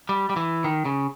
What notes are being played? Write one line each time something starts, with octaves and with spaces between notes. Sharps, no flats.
G3
G3
E3
D#3
C#3